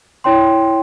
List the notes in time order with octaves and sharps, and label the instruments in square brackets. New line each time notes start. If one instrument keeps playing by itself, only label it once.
[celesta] E4 C#5 G5 C6